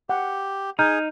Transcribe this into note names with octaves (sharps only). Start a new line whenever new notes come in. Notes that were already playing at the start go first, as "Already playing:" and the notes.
G4 F#5
D#4 G#4 A#5 F6 G6